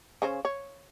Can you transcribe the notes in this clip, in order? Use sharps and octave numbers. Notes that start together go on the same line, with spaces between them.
C#3 C#4 C5
C#5